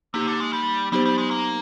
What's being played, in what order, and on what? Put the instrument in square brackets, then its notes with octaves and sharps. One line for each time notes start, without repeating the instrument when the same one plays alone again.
[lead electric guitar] C3 [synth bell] A#3 D#4 G4
[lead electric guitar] D3
G#3
G3
[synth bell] F#3 B3 D#4 G4 C5 [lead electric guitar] G3
[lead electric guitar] G3
G#3
A#3